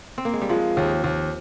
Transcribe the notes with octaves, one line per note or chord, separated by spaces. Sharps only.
C4
A#3
G#3
G3
F3 G#3
D#2
D#2